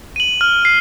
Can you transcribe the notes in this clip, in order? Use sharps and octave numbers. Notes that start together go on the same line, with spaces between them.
D#7 F#7
F6
C7